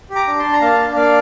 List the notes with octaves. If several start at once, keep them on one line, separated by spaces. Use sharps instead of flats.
G4
A#5 D6
D4
A5 C6
D4
A#5
A#3 F5 A5
D4
A#3 D5 F5